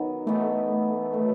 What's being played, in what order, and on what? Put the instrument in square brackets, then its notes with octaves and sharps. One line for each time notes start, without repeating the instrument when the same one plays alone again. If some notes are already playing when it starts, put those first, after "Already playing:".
Already playing: [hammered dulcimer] D#3 F#3 B3 F#4
[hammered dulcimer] E3 B3 D#4 [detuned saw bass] A3
[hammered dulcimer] D#3 F#3 B3